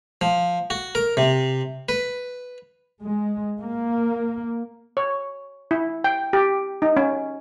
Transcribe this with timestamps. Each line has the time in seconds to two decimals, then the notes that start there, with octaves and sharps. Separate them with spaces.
0.21 F3
0.70 F#4
0.95 A#4
1.17 C3
1.89 B4
3.03 G#3
3.59 A#3
4.97 C#5
5.71 E4
6.04 G5
6.33 G4
6.82 D#4
6.97 C#4